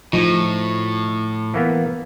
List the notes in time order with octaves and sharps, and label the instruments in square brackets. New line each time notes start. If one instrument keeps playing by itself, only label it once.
[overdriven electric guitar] A2 [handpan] F3 [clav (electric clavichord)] D#4
[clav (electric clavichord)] E3 A#3 B3